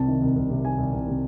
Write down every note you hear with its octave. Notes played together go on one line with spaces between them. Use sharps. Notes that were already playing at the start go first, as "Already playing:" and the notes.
Already playing: C2 C3 A5
D#3
C2
C2
C3
D#3 G#5
C2
C2
C3